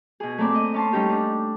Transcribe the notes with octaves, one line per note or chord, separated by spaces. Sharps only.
B2 G#4
A3 A#3 C4 D5
D#5
C#4 D#5 A5 C6
G3 C#4 D#4 G4
D4